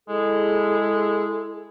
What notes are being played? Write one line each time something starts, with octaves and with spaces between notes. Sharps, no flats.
G#3 E4 G#4 A4